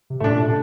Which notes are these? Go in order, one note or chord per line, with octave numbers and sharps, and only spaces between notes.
C3
A2 A3 D4
A#2
C3